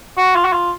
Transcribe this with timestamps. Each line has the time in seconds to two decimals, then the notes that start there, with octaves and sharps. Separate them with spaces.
0.17 F#4
0.36 F4
0.44 F#4
0.53 F4